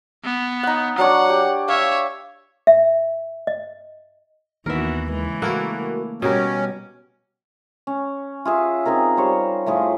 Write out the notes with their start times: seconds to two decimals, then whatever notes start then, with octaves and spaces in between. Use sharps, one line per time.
0.24 B3
0.63 D#4 F#5
0.98 F#3 D4 C#5 F#5
1.29 G4
1.68 C#5 E5 F5
2.67 E5
3.47 D#5
4.66 D#2 D#3 E3 B3 F#4 A#4 E5
5.09 C#3 E3 G#3
5.42 A3 A#3 E4 F#4 A#4 F#5
6.22 B2 G3 C#4 G4 A#4 G#5
7.87 C#4
8.45 F4 G#4 E5
8.85 C4 D#4 G#4 A#4
9.17 G3 C5 C#5
9.66 A2 F3 G#4